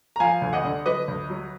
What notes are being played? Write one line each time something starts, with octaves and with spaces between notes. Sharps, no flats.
A#5
F3 F5 G#5
D2
D#5 F#5
D3
F#3 B4 D#5
D2
F#3